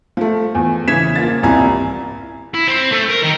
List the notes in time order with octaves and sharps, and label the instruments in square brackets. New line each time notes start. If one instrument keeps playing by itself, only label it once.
[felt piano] F3 A3
E2
C#3 E3 G#6 B6 E7
F3 A#3 A6
D#1 C2 E4 G#5 A#5
[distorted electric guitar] E4
C4
A3
A#4
D#3 D#4